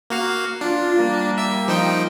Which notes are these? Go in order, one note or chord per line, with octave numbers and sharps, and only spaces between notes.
A#3 F#4 F5
D4 F4
G3 A#3
E5 E6
F3 D#4 G5